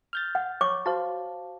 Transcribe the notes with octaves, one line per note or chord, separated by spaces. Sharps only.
F6 G6 A6
F#5
C#5 C#6 D6
F#4 C5 F5 A5